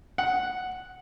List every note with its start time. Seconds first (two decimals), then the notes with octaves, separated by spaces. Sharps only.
0.18 F#5